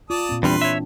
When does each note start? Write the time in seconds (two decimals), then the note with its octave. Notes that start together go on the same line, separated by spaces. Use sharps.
0.10 F4 D5 A5 D#6
0.29 A#2 C4
0.43 E2 E3 G3 C4 D4 B4 C6
0.62 C#5 E5